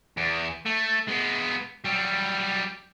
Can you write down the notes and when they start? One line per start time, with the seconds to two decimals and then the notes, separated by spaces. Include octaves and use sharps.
0.17 E2
0.66 A3
1.08 G#3 B3
1.84 F#3 G3